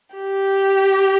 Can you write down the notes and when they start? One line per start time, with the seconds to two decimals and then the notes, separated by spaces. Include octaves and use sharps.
0.16 G4